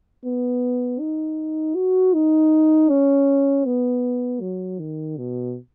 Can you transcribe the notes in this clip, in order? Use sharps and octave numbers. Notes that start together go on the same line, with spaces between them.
B3
D#4
F#4
D#4
C#4
B3
F#3
D#3
B2